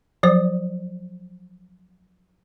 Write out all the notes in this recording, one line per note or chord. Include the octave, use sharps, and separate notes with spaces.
F3 F#3 C5